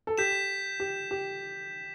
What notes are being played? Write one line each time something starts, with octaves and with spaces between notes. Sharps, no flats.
A4
G4 G6 B6 E7
G4
G4